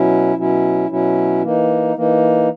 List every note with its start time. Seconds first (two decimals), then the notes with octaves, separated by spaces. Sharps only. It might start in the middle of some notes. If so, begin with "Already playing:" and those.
Already playing: B2 F#3 C#4 E4
0.36 B2 F#3 C#4 E4
0.89 B2 F#3 C#4 E4
1.42 E3 A#3 D#4
1.96 E3 A#3 D#4